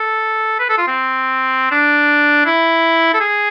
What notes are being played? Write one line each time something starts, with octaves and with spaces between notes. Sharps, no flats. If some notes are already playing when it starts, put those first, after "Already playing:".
Already playing: A4
B4
A4
F4
C4
D4
E4
A4
G#4